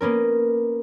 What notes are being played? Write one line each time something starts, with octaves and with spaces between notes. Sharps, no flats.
A#3 B3 C#4 A#4